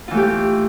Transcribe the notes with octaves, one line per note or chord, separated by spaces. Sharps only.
E3 A3 F4 G4